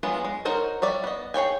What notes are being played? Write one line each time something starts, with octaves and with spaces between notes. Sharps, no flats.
E3 F#3 G#3 B3 F4
G#3
D#4 F#4 A#4 C5 C#5
G3 C#5 D5 E5
B3 D#5
G#4 C#5 G5 G#5